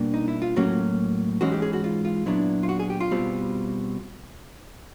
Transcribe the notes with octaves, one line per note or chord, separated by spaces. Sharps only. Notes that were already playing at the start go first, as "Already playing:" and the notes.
Already playing: B2 G3 A#3 D4
D#4
E4
F4
A2 F#3 A#3 C#4 F#4
G#2 E3 G#3 C#4 F#4
G4
G#4
F#4
F4
F4
A#2 F#3 B3 D4 E4
F4
F#4
G#4
G4
F4
B2 G3 C4